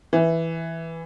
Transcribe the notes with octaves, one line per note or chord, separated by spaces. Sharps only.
E3